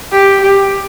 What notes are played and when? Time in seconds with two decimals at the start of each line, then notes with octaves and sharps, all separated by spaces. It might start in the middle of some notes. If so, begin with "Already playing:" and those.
0.12 G4
0.42 G4